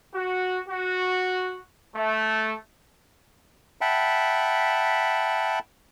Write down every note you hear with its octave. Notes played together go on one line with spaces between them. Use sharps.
F#4
F#4
A3
E5 F#5 G5 A5 B5